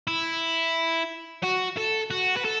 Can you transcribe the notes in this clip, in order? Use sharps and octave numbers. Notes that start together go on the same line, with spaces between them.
E4
F#4
A4
F#4
B4
A4